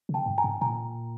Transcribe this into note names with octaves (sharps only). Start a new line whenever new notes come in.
C#3
G5 A5
G2
G#5 A#5
G#2
A#2 G#5 A#5